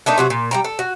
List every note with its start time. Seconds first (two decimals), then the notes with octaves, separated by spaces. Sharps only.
0.06 A3 A#3 D4 D#4
0.18 C3 F#3 F#4
0.30 A#2
0.51 G3 G5 A#5
0.64 A4
0.79 F#4